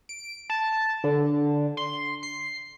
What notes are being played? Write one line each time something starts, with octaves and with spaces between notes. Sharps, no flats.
D7
A5
D3
C6
C7